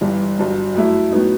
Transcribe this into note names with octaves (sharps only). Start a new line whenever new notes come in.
G1 G2 E3 G3
G1 G2 F#3
F#2 F#3 A3 E4
A2 F#3 B3 D#4